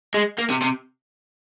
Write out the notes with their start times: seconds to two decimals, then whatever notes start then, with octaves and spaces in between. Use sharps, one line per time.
0.14 G#3
0.39 A#3
0.50 C3
0.62 C3